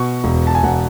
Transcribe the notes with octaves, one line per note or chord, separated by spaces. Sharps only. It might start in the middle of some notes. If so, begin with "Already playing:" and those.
Already playing: B2 C#6
E1
A5
G#5
E1 F#5